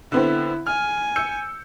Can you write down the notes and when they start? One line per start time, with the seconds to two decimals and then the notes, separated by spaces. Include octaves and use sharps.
0.12 D3 B3 C4 E4
0.67 G#5 F6
1.16 E6 G6 C#7